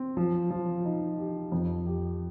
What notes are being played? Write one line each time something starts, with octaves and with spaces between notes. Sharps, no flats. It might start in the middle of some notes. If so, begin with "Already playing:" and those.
Already playing: C4
F3
F3
D#4
G4
F2
G4